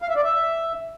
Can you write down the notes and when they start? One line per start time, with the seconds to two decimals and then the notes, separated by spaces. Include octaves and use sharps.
0.02 F5
0.09 E5
0.16 D5
0.24 E5